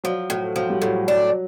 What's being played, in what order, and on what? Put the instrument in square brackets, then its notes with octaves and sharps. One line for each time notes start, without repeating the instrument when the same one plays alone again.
[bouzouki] F3 [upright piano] F#3
[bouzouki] A2 [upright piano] F#3
[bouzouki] F3 [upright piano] F#3
[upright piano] G3
[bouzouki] A2 [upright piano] F#3
[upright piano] F#3 [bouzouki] D4